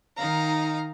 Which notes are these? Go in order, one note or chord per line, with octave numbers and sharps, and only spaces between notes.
D#3 D#4 F5 A#5